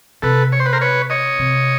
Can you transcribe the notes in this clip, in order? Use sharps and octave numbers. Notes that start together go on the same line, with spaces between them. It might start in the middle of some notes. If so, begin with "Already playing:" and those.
C3 A4 B4
C#5
C5
B4
A#4 C5
B4 C#5
C#5 D#5
C3